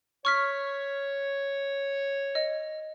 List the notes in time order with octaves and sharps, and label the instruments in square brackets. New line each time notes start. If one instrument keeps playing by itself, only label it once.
[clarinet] C#5 [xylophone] C#6 F6 B6
[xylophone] D#5